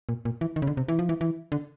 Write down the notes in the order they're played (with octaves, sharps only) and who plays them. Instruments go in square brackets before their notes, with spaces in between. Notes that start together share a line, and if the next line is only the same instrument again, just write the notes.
[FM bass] A#2
A#2
E3
D#3
C#3
D3
C3
E3
F3
E3
E3
D3